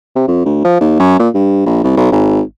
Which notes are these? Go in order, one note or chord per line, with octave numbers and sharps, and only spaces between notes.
C3
F2
D2
F3
D#2
F#2
A#2
G2
A#1
C2
B1
G#1